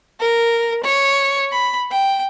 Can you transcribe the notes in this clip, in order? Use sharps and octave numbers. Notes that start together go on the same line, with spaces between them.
A#4
C#5
B5
G5